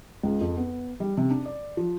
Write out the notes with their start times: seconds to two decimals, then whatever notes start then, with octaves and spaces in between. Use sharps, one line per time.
0.23 C#2
0.41 F2
0.57 B3
1.00 G3
1.17 C3
1.30 D4
1.45 D5
1.77 F3